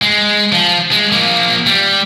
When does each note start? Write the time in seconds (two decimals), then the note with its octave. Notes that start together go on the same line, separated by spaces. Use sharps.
0.02 G#3
0.52 F3
0.91 G#3
1.12 F3 A#3
1.66 G3